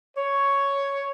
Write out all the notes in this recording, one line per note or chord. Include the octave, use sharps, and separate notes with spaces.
C#5